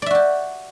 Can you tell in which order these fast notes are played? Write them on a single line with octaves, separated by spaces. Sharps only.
D5 E5 F#4 G4